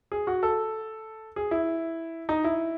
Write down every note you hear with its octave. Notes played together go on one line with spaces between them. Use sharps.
G#4
F#4
A4
G#4
E4
D#4
E4